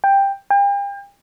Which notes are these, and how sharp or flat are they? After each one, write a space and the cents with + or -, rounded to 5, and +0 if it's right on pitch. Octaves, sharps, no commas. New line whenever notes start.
G5 +10
G5 +40